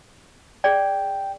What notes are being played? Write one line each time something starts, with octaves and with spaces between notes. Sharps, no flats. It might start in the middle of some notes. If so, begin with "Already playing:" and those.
G#4 D5 G5